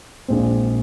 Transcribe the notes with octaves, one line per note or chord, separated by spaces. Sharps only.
A#1 A#2 G#3 C4